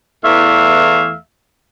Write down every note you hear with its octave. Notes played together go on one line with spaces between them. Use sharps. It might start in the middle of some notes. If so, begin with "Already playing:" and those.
E2 E3 A3 E5 F5